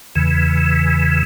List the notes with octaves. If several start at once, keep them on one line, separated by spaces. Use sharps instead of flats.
E2 C#3 E3